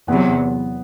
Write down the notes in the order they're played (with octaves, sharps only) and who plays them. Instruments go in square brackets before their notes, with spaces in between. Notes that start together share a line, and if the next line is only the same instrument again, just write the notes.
[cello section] E2 C3 F#3 [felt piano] B3